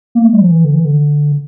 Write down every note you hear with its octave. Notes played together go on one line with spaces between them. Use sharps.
A#3
A3
G3
F3
E3
D3
E3
D3